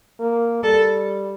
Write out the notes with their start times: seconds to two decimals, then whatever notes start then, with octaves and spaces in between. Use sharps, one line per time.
0.20 A#3
0.63 G3 A4